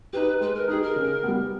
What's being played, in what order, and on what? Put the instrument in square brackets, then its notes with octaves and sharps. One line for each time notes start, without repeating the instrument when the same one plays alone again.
[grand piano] D#4 G4 [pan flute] B4
[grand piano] G#3 [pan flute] B4
[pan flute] A#4
[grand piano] D#4 G4 [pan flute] G#4
[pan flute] A#4
[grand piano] C#3
G3 B3